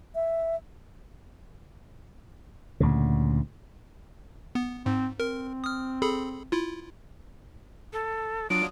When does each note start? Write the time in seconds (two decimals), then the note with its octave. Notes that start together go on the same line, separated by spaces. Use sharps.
0.15 E5
2.80 D2 A#2 C#3
4.55 B3
4.86 G#2 C4
5.20 C4 A#4
5.64 D#6 F6
6.02 G#4 A4 B5
6.52 E4 F4
7.93 A4
8.50 F#3 D4 F4 D#6 D7